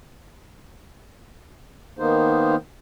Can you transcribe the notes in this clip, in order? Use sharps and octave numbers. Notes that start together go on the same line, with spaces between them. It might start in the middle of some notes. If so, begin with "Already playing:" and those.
D#3 A#3 B3 D#4 C5